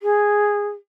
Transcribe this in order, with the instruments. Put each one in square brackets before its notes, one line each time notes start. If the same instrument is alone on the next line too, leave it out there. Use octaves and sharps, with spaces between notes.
[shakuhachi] G#4